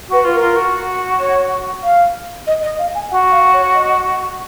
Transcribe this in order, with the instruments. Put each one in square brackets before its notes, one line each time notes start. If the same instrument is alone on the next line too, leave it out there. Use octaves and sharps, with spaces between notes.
[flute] F#4 [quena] B4
[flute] F4
[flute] F4 [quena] A#4
[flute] F#4
[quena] C#5
F5
D#5
D#5
F5
G#5
[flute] F#4 [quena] F#5
[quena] F5
C#5
D#5